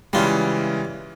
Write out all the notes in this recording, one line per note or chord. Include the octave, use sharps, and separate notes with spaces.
C#3 E3 G3 G#3 F4